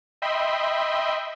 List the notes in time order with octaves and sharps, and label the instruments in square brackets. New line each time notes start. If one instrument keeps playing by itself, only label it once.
[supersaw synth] D#5 E5 G5 B5 C6